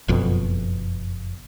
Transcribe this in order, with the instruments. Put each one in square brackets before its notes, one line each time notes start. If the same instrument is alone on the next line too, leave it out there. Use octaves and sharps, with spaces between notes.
[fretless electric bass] F#1 F2 B2